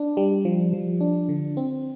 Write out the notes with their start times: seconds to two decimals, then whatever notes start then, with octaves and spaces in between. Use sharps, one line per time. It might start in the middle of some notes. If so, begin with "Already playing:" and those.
Already playing: D4
0.17 G3
0.45 F3
0.73 F3
1.01 D4
1.29 D3
1.57 C4